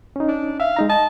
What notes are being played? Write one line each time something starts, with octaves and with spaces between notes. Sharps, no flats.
C#4 D#4
D4
E5 F5
G#3 D#4 A#5
D#5 A5